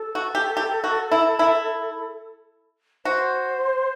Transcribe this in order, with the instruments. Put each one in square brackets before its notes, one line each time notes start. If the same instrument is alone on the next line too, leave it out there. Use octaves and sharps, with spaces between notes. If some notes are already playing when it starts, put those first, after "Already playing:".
Already playing: [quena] A4
[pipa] F#4
G4
G4
F#4
E4
E4
[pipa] F#4 [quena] C5